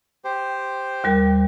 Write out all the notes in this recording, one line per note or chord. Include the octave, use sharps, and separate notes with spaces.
G4 C5
D#2 G3 A#4